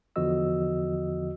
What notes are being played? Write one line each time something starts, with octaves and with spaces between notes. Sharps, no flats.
E2 D3 F3 F#4 D#5 E6